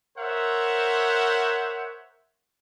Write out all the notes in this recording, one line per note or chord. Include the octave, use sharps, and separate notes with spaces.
A#4 C5 C#5 E5 F#5